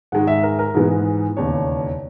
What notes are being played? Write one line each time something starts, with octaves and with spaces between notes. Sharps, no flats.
G#2 D#3 G#3 D#4 F#5
E5
A#4
A#4
G#2 E3 G#3 B3
E1 D#2 C#3 C#5